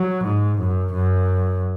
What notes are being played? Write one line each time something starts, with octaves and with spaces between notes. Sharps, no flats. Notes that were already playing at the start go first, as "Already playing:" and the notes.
Already playing: F#3
G#2
F#2
F#2